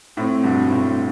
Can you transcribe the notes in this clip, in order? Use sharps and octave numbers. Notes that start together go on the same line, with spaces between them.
A2 C4
G2 B2
A2
G2